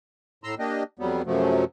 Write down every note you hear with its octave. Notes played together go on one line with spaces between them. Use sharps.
A2 A#5 C6 E6
A#3 D4 G4 D#5
F2 F#3 G3 B3
F#2 C3 F3 F#3 A3